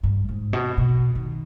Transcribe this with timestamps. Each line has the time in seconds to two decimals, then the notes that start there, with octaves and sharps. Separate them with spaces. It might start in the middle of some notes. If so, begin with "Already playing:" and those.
0.03 G2
0.29 G#2
0.53 B2
0.78 B2
1.15 D#3